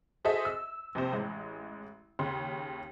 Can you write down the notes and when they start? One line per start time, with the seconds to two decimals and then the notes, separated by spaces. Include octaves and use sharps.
0.24 F#4 G#4 A4 C5 D#5 E5
0.45 E6
0.95 A#1 C3 C5
1.13 A1 G#3
2.19 D#2 C#3 C6